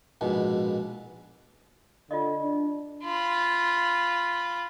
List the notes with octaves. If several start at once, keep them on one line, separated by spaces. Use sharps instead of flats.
A#1 G#2 B2
D3 F4 D5 D#5
D4
F4 B5